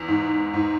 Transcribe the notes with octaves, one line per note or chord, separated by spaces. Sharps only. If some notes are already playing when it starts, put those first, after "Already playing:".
Already playing: E2
G#2
G#2